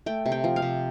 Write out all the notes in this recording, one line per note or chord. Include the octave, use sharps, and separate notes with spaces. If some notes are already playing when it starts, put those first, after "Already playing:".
A3 G5
C3
G5
F3
F5
C3